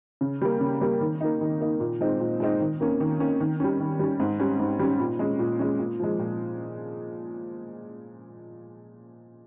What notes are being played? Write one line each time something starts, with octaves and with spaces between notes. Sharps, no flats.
C#3
G3 A#3
C#3
G3 A#3
D#3
A#3 D#4
D#3
A#3 D#4
A#2
G#3 C4 D#4
A#2
G#3 C4 D#4
D#3
A#3 C#4
D#3
A#3 C#4
D#3
G3 C#4
D#3
G3 C#4
G#2
G3 C#4
G#2
G3 C#4
A#2
G#3 C#4
A#2
G#3 C#4
A#2
F3 G#3
A#2